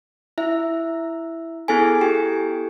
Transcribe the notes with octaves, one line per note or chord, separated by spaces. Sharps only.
E4 E5
B3 E4 G#4 A4 G#5
G4 G5